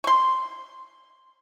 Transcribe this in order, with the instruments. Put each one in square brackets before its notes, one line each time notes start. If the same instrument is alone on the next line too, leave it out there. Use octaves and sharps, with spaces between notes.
[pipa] C6 C#6